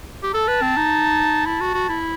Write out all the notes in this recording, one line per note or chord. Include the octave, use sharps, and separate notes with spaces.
G4
A4 A5
B4
C4
D#4
E4 A5
F#4
F#4
E4